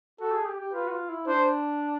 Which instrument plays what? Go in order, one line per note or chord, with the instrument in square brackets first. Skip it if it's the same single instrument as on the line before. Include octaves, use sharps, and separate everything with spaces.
[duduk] F#4 [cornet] A4
[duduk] G#4
G4
G4
[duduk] F4 [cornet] B4
[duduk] F#4
F4
E4
[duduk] D4 [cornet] C5